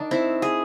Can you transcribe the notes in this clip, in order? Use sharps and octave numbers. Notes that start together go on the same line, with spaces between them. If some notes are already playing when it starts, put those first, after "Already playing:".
Already playing: D#3 D4
C4 E4
G#4